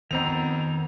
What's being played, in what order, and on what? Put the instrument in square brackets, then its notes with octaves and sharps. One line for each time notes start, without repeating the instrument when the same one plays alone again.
[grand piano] F2 C4 F7 [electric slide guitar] D#3 B3 A#5